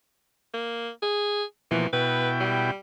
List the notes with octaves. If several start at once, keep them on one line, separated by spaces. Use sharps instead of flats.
A#3
G#4
B2 E3 F3 A#3
B2 E4 B4 G5
G3